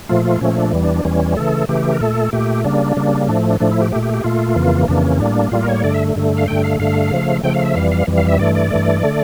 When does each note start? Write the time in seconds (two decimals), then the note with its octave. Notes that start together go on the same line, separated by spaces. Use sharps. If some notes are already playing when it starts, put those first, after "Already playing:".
0.09 A#2 F3 A3 F4
0.25 F4
0.41 A#2 F3 A3 C#4
0.57 D4
0.73 E2 E3 G3
0.83 D4
0.94 D4
1.05 E2 E3 G3 C#4
1.37 C#3 E3 A3 A4
1.69 C#3 E3 A3 G4
1.93 A#4
2.01 A#2 A3 A4
2.33 A#2 A3 G4
2.64 C#3 G3 A#3 D4
2.97 C#3 G3 A#3
3.29 A2 F3 A3 D4
3.50 D4
3.60 A2 F3 A3 D4
3.71 E4
3.82 G4
3.92 A#2 A3 G4
4.03 G4
4.14 G4
4.24 A#2 A3 F4
4.56 F2 C#3 E3 A#3
4.88 F2 C#3 E3 A#3 D4
5.04 C#4
5.20 A2 G3 A#3 D4
5.52 A2 G3 A#3 F4
5.62 A#4
5.68 C#5
5.84 G2 D3 A3 D5
5.94 E5
6.16 G2 D3 A3
6.37 F5
6.48 G2 D3 A3 G5
6.64 F5
6.79 G2 D3 A3 F5
7.11 C#3 F3 A3
7.43 C#3 F3 A3 G5
7.54 F5
7.65 E5
7.75 F2 E3 G3 F5
7.91 F5
8.07 F2 E3 G3
8.18 F5
8.28 E5
8.39 G2 E3 A3 D5
8.55 D5
8.71 G2 E3 A3
9.03 D3 A3